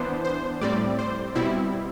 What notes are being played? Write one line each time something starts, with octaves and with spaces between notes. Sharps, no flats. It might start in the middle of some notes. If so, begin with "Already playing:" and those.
Already playing: E3 B3 D4 C5
C5
A2 G3 C4 D5
C5
B2 G3 C4 E4